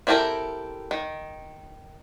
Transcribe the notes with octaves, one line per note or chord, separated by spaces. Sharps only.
C4 E4 G4 A4 A#4
D#3